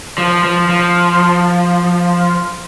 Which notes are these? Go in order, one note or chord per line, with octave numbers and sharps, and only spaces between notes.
F3
F3
F3